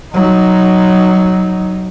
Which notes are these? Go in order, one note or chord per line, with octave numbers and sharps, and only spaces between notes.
F#3 D#4